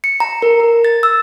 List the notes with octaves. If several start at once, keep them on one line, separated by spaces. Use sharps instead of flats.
C#7
A#5
A#4
A#4
A6
E6